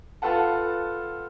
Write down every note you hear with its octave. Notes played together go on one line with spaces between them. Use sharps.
F4 A4 B4 F#5 A5